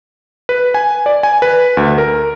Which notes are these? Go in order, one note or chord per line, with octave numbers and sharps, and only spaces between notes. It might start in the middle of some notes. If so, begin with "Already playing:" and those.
B4
G#5
D5
G#5
B4
D2
A#4